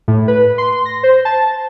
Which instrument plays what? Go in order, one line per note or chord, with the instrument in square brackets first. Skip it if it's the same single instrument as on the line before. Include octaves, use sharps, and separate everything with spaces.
[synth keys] A2
B4
C6
A#6
C5
A5